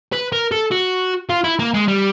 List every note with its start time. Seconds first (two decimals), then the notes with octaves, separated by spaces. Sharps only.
0.13 B4
0.33 A#4
0.52 A4
0.71 F#4
1.30 F4
1.44 E4
1.59 A#3
1.74 G#3
1.88 G3